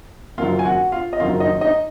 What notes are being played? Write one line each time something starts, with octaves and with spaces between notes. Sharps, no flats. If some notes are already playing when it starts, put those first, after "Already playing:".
F#1 F#2 D#3 F#3 F4 F5
G#5
F#4 F#5
F4 F5
D#5
F#1 F#2 D#3 F#3 F4 F5
D#4 D#5
D#4 D#5